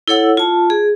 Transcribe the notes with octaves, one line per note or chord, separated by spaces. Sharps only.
E4 A4 C#5 F#5 E6
F4 A5
G#4